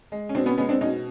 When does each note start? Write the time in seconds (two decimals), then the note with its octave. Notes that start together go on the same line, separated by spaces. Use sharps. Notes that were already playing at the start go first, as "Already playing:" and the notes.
0.12 G#3
0.29 C#4
0.35 B2 C4 D4
0.46 B3 C#4
0.58 G#3 B3 C#4
0.69 C4 D4
0.81 B2 C#4 D#4